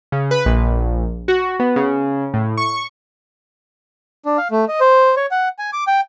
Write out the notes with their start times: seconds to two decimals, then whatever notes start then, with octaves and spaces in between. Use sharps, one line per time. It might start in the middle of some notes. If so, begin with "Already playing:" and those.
0.12 C#3
0.31 B4
0.46 A#1
1.28 F#4
1.59 B3
1.76 C#3
2.34 A2
2.57 C#6
4.25 D4
4.38 F5
4.51 A3
4.68 D#5
4.80 C5
5.17 C#5
5.31 F#5
5.59 G#5
5.73 D6
5.87 G5